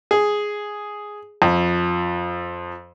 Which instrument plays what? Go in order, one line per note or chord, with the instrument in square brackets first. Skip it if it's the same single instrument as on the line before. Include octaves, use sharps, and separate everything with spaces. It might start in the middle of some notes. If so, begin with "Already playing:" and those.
[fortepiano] G#4
F2